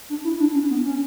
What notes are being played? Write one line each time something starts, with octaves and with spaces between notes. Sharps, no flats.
D4
E4
D4
C#4
B3
C#4